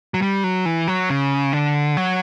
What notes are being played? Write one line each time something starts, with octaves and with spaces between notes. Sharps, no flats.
F#3
G3
F#3
E3
F#3
C#3
D3
F#3